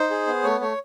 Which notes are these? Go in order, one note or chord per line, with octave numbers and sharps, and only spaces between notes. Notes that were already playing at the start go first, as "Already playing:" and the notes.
Already playing: D#4 C5
G#4
B3
A3 C#5
A3 C#5